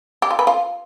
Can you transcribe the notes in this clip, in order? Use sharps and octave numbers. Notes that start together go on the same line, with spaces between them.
G4
F4
B4
F4